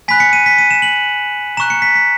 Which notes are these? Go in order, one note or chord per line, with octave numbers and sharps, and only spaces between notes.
G#5 B5 F#6 B6
C#7
D#7
B6
D#7
E7
F#7
A#5 C#6 F#6 E7
C#7
B6
B6